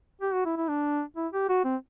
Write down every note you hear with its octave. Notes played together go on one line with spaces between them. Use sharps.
G4
F#4
E4
E4
D4
E4
G4
F#4
C4